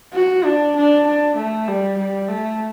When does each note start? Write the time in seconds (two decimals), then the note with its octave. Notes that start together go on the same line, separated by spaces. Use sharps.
0.14 F#4
0.44 D4
0.76 D4
1.07 D4
1.36 A3
1.68 G3
1.98 G3
2.29 A3